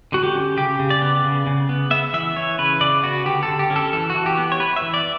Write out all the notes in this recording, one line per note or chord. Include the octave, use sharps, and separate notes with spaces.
D3 F#4
G4
C#4
C#3 G4
C#3
D5
B3
C#3
C#3
B3
B3 E5
E3 E5
E3 C#5
C#3 B4
C#3 D5
B3 F#4
D3 G4
A4
D3
G4
C#4
A4
E3 A4
F#4
E3
G4
B3
C#5
B3 B4
E5
E3
D5